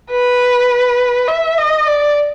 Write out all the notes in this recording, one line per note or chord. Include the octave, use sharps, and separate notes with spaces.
B4
E5
D#5
D5